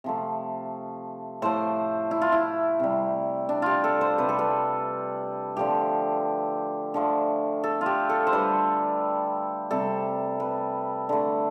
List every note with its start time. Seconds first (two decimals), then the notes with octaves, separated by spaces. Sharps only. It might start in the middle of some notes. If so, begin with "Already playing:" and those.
0.04 C3 F3 A3
1.42 A2 F3 A3 C5
2.11 E4
2.22 F4
2.32 E4
2.80 C3 G3
3.49 D4
3.62 F4 G4
3.84 A4
4.01 C5
4.18 C3 G3 B4
4.29 A4
4.39 B4
5.57 D3 F3 A3 G4
6.94 D3 F3 A3
7.64 A4
7.81 F4
7.86 G4
8.09 A4
8.27 C5
8.32 D3 G3 B4
9.71 C3 G3 A4
10.40 B4
11.09 D3 A3